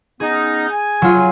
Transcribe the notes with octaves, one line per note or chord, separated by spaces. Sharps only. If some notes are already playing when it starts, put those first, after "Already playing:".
B3 C#4 D#4 G#4
G#5
F#3 F4